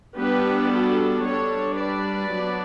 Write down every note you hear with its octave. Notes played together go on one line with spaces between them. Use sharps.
G3 B3 D4 G4 B4
F#4 A4
G3 D4 A4 C#5
B4 D5
F#3 B3 D4